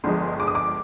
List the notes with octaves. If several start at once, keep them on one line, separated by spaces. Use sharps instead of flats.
G1 G2 F3 G#3 C6
D6
D#6
D6